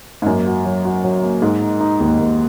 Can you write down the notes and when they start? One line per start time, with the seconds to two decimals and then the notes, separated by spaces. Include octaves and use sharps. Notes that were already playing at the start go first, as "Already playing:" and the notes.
0.22 G#2
0.26 F#2 A#3
0.47 F#4
0.65 F#3
0.85 F#4
1.04 F#3
1.23 A#3
1.42 G#2 G#3
1.62 D#4
1.81 D#4
2.00 D#2
2.19 D#2